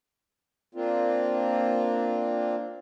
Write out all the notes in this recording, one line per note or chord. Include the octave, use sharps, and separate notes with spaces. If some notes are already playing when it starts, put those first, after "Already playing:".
A#3 C4 D4 F4